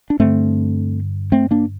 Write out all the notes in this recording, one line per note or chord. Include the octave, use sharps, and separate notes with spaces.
D4
G2 D3 A3 C4
A3 C4
A#3 D4